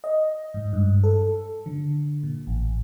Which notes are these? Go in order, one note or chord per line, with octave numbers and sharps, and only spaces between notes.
D#5
G#2
G2
A4
D3
A#2
A1